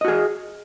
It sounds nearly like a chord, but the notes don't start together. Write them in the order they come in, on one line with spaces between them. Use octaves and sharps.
D#5 F#4 G#4